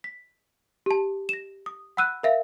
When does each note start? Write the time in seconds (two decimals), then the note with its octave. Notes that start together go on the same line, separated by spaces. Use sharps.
0.04 B6
0.86 G4 A5
1.29 A#6 E7
1.66 D#6
1.97 F#5 B5 E6 F#6 D#7
2.23 A#4 E5 F5